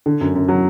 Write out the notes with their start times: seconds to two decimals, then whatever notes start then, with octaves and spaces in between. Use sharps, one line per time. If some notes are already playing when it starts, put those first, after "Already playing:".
0.06 D3
0.21 F#2
0.35 F#2
0.48 F#3